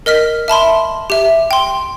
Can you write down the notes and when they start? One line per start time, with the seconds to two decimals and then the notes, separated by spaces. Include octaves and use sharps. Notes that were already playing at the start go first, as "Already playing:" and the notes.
0.06 A#4 D#5 F6 B6
0.48 E5 A5 B5 C6
1.10 G4 E5
1.51 G5 C6